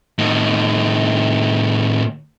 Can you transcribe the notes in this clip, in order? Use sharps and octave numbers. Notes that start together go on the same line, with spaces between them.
A2 D#3